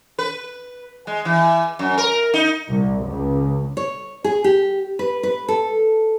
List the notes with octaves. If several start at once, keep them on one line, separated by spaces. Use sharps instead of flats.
B4
G#3
E3
F#2
A#4
D#4
C2
C#2
C#5
G#4
G4
B4
B4
A4